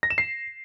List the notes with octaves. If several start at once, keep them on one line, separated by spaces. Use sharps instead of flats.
A#6
E7
C7